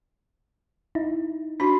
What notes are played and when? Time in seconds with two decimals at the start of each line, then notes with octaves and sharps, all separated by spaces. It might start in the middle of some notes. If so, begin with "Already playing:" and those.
0.95 D#4 E4
1.60 D4 F#4 B5 C6